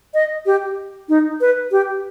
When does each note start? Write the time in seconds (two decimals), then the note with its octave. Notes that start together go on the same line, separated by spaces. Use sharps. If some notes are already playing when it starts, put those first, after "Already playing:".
0.14 D#5
0.46 G4
1.09 D#4
1.41 B4
1.72 G4